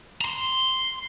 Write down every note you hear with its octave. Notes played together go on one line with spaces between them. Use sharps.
A#5 C6